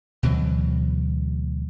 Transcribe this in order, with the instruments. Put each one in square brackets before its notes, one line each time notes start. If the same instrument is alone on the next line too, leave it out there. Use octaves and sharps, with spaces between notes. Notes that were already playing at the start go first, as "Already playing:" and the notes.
[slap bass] D2 B2 E3 F#3